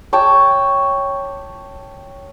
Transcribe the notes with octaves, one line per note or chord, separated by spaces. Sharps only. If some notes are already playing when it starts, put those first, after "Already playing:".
C#5 G5 A5 D6